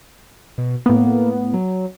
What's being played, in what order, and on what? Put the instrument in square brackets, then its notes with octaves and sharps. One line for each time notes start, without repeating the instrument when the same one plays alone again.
[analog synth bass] B2
[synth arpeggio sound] A2 B3 [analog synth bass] A#3
[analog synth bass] F#3